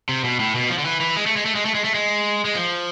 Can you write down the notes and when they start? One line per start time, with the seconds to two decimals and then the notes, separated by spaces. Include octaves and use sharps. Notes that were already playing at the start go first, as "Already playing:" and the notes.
0.09 C3
0.24 B2
0.40 A2
0.55 B2
0.70 F3
0.78 D3
0.85 E3
1.00 E3
1.17 G#3
1.26 A3
1.36 G#3
1.45 A3
1.55 G#3
1.65 A3
1.75 G#3
1.84 A3
1.94 G#3
2.45 G#3
2.55 F3